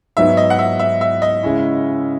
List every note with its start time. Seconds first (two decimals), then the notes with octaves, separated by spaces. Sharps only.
0.17 G#2 F#3 B3 D#4 E5
0.37 D#5
0.50 F#5
0.59 E5
0.79 E5
1.01 E5
1.22 D#5
1.43 C#3 G#3 C#4 E4